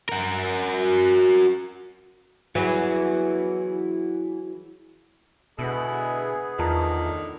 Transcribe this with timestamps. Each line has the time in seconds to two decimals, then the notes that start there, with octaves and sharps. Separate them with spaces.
0.09 F#4 A#4
2.55 E3 F#3 E4 G#4
5.59 B2 D3 G#3 B3 E4 G#4
6.59 E2 A2 D3 D#3 F4 A5 A#5